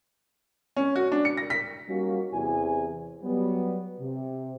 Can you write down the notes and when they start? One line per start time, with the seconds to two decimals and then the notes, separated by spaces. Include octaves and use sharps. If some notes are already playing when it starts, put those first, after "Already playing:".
0.76 C#4
0.96 F#4
1.12 D4
1.25 C#7
1.37 A#6
1.50 B6
1.88 G3 A#3 C#4 D#4 F4 F#4
2.33 E2 C3 G#5
3.23 F#3 G3 B3
4.00 C3